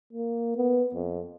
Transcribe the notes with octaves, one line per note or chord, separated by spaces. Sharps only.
A#3
B3
F2